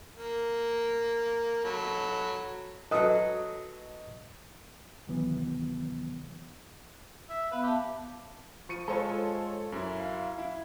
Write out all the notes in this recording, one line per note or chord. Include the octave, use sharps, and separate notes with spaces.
A#3
F#3 A4 B5
F#3 A4 B4 D#5 D#6
D2 C3 D#3 E3 F#3 B3
E5
B3 B4 F5
G4 E5 A5
F3 C#6 C#7 D#7
G#3 F4 A4 C5 C#5
F#2 E4
F5
E4